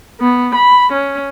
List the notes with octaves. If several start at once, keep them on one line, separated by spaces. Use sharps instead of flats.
B3
B5
C#4